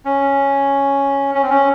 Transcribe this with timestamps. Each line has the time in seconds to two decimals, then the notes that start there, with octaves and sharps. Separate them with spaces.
0.05 C#4
1.35 C#4
1.43 C4
1.50 C#4